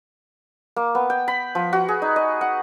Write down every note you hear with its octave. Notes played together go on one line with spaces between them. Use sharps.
A#3
B3
G5
B5
F3
F#4
G#4
D#4
D#5
F#5